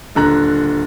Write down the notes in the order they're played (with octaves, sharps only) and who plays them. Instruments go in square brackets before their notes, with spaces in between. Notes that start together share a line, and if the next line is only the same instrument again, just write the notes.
[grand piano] D#1 D3 A#5 F#6